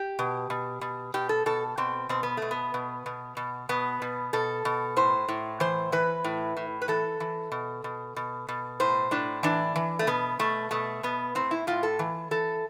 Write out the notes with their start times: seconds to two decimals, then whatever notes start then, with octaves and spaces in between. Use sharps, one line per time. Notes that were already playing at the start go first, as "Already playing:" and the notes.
Already playing: G4
0.19 B2
0.50 B2
0.81 B2
1.14 B2 G4
1.29 A4
1.46 B2 A4
1.78 B2 C4
2.09 B2 C4
2.23 B3
2.37 B2 A3
2.51 B3
2.74 B2
3.06 B2
3.37 B2
3.69 B2 B3
4.02 B2
4.33 B2 A4
4.65 B2
4.97 A2 C5
5.28 A2
5.60 E3 C5
5.92 E3 B4
6.24 A2
6.57 A2
6.82 B4
6.88 E3 A4
7.20 E3
7.52 B2
7.84 B2
8.16 B2
8.49 B2
8.80 A2 C5
9.11 A2 D4
9.43 E3 D4
9.76 E3
9.99 A3
10.07 B2 B3
10.39 B2 A3
10.71 B2 A3
11.03 B2 B3
11.35 A2 C4
11.51 E4
11.67 A2 F4
11.83 A4
11.99 E3
12.31 E3 A4